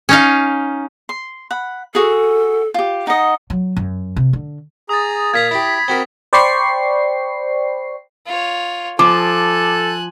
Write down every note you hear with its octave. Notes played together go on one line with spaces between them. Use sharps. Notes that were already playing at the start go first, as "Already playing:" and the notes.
C#4 D#4 F5
C6
F#5 B5
F#4 G#4 A4
F4 G4
D#4 D#5 F#5
F#3
F#2
C3
D3
G#4 A#5 D#6 A6
A#2 F5 A#5 G#6 B6
E4 G4 B5
C4 F#4 A#4
C5 D5 G5 B5 C#6 C7
F4 C#5
F3 A4 G#5 D6 F#6